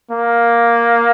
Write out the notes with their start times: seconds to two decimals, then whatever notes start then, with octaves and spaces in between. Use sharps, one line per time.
0.11 A#3